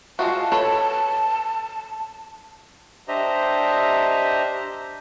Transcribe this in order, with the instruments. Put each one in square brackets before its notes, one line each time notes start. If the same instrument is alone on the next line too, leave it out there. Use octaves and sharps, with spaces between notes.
[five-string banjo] G#3 F4 F#4 [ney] A5
[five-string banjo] A4 B4 C#5
[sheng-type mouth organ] D4 G4 C5 D#5 E5 A#5